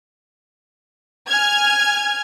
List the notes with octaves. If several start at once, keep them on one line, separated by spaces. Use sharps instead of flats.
G#5 F6 G#6